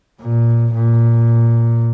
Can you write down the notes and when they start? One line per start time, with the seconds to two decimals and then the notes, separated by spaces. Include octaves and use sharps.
0.21 A#2
0.74 A#2